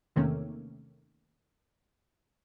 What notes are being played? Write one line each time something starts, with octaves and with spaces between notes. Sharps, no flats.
E2 C3 D#3 A3 A#3 C#4